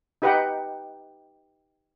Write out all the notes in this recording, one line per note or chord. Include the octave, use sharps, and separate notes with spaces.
D#4 G4 B4 D#5 F#5 G5